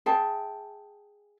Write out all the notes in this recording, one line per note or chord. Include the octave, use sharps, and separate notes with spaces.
G#4 E5 G5 A5